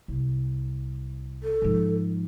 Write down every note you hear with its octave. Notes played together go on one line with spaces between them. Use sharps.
C2
A4
G#2 F3